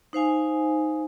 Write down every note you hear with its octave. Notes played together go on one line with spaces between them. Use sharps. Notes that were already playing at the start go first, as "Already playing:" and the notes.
D#4 C5 F5 G#5